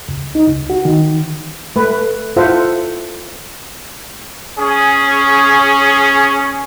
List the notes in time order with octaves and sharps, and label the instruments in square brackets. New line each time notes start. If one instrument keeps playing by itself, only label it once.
[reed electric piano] C#2
D#4
C#2
F#4
D#3
[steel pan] A3 B4
E4 F4 A4 C5 E5 F#5
[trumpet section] C#4 G#4